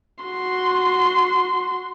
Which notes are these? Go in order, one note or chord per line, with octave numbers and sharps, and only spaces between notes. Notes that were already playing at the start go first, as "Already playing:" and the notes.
F#4 C6